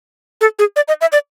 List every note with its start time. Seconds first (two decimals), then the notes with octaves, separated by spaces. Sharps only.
0.41 A4
0.59 G#4
0.76 D5
0.88 D#5
1.01 E5
1.12 D5